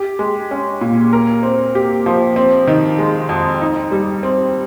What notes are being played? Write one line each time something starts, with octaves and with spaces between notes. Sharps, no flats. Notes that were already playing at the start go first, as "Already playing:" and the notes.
Already playing: G4
G#3
C#4
A#2
A#4
C4
G4
F3
C4
D#3
G#3
F2
D#4
G3
C4